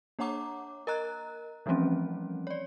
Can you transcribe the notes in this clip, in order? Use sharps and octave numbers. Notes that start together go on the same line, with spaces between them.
A#3 D4 C#5 F#5 A#5 D6
A#4 D#5 A#5 F#6
E3 F3 G3 A3 C4 C#4
C#5 D5